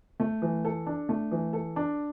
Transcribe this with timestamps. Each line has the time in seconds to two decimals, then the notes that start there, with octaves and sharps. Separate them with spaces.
0.20 A3
0.42 E3
0.65 A4
0.87 D4
1.09 A3
1.31 E3
1.53 A4
1.76 D4